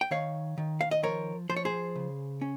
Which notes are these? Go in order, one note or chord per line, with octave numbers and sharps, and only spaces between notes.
G5
D#3 C#5 F5
D#3
F5
D#5
F3 A#4 C#5
F3 C5
C#5
G#4 C5
C#3
C#4